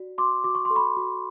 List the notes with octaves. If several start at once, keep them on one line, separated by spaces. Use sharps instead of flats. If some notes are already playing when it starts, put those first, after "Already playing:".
Already playing: F#4 D5
F#4 C6 D6
F#4 D6
C#6
C6
A4
B5 C#6
F#4